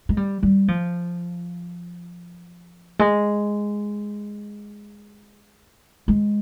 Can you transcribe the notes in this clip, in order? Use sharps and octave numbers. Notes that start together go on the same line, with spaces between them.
G#3
G3
G3
F3
G#3
G#3